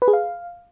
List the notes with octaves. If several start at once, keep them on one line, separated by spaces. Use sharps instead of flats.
B4
G#4
F5